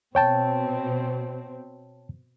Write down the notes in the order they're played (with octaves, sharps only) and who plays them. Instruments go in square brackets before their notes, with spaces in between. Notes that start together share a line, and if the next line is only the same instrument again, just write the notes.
[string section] B2 C4 [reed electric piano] C#5 G5 A5